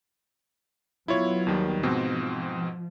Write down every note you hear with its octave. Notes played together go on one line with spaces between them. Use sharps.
F#3 B3 E4 F4 C#5
D#2 D#3 G3
G#2 B2 F3 C4